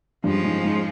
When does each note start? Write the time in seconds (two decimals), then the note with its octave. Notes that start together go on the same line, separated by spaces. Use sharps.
0.24 G2 F3 G#3 C#4 F4
0.44 G#2
0.64 G#2